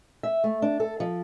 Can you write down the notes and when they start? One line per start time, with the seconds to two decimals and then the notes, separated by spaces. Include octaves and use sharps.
0.23 E5
0.44 A3
0.62 D4
0.80 A4
1.00 F3